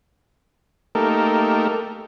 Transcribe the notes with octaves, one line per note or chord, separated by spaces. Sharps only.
A3 A#3 D#4 G4 A4 A#4